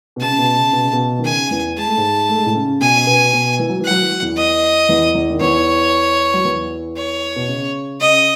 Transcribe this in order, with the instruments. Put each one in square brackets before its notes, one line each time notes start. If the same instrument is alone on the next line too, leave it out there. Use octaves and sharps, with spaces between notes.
[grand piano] B2
[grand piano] C#3 [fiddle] A5
[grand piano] C#3
B2
C#3
B2
C#3
B2
D#3
[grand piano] C#3 [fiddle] G#5
[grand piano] E2 E3
[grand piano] G#3 [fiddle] A5
[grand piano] A3
G#2 G#3
A3
G#3
A2 A3
C#3 C#4
[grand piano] B2 B3 [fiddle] G#5
[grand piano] C#4
B2 B3
B2 B3
E3
F#3
[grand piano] E3 [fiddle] F#5
[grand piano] F#3
E3
F#3
E2 E3
[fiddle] D#5
[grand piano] E2 E3
E2 E3
D#3
[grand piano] E2 E3 [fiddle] C#5
[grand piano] F#3
E2 E3
[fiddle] C#5
[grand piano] B2
C#3
[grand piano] C#3 [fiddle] D#5